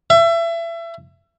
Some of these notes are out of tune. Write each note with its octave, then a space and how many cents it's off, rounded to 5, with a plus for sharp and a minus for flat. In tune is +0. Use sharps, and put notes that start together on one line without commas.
E5 +30